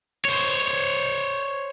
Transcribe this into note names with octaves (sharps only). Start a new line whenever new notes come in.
C5 C#5